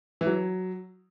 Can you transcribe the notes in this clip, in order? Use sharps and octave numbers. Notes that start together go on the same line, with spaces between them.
E3
F#3